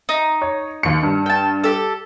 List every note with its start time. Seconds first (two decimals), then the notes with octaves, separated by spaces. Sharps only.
0.09 D#4
0.42 C#5
0.83 D#2 C#7
1.03 G2
1.26 G5 A5
1.64 G4 A4